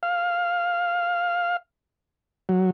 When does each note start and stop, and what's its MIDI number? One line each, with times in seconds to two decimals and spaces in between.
0.03 1.57 77
2.49 2.70 54